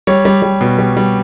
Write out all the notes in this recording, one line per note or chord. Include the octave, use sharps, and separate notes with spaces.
G3 C#5
G3
G3
B2
G3
G3